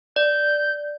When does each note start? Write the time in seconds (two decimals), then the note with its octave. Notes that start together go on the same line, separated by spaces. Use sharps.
0.16 D5 G6